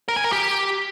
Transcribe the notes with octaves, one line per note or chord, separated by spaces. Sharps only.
A#4
G#5
A#4
G4